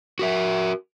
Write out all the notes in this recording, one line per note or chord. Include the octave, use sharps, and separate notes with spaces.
F#4 A#4 E5